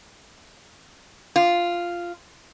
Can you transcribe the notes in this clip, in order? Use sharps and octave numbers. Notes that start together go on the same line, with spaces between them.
F4